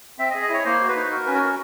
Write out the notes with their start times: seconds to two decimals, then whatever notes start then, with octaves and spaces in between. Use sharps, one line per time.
0.19 C4 E5
0.30 D#5
0.35 G#4
0.42 D#5
0.49 E4 C#5
0.65 A#3 C5
0.81 F#4
0.88 B4
0.95 D#4
1.11 F#4 A#4
1.26 C#4 B4
1.35 A#4
1.42 F#4